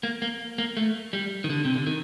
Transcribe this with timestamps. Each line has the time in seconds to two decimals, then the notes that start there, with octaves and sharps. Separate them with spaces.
0.03 A#3
0.22 A#3
0.58 A#3
0.77 A3
1.13 G3
1.44 D#3
1.50 D3
1.65 C3
1.76 D3
1.87 D#3